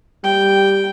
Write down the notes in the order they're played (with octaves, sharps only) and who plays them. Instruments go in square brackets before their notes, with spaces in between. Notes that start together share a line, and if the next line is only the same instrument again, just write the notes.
[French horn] G3 [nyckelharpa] G5